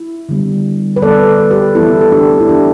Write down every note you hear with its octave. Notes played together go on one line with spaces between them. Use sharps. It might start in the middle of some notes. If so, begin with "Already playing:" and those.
Already playing: E4
D3 G3 B3
B4
D3 G3 B3 A4 D5
G4 B4
E3 B3 E4 A4
A4
D4 G4
E4
E3 B3 D4 G4